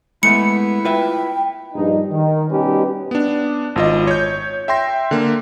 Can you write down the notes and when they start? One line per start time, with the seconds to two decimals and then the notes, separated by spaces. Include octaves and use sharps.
0.23 G#3 A3 B3 E4 C#7
0.85 F4 B4 E5 G5
1.74 A#1 G2 D#4
2.11 D#3
2.50 B2 G3 C#4 D#4 G4 B4
3.11 B3 D4
3.76 G#1 F4 D#5
4.07 C#5 G6
4.68 E5 G5 C6 A#6
5.11 D3 A#3